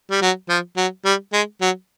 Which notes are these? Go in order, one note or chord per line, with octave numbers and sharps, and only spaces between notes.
G3
F#3
F3
F#3
G3
G#3
F#3